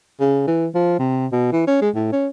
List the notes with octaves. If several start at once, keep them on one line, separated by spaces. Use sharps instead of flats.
C#3
E3
F3
C3
B2
E3
C#4
G#3
A2
C#4